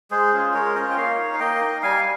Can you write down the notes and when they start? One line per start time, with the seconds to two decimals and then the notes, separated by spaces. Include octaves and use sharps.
0.11 G#3 G#4 C5
0.32 C#4 F4
0.54 G#3 A#4 C#5
0.75 C#4 F4 C5 D#5
0.91 G5
0.96 A#3 C#5 F5
1.19 D#4
1.34 F5
1.40 A#3 D#5 G5
1.61 D#4
1.82 G3 F5 G#5